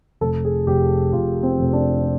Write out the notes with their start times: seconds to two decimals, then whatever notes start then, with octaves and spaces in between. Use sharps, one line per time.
0.21 F1 A4
0.45 G#4
0.67 F1 G4
1.13 F1 F4
1.43 C4
1.59 F1
1.73 D4